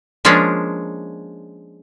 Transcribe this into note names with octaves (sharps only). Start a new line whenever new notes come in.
F3 G#3 A#3 C#4 D4